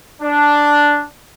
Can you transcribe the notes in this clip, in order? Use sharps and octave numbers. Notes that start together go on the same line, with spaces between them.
D4